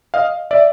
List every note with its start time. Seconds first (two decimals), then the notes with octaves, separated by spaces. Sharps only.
0.14 D#5 F5
0.51 D5 E5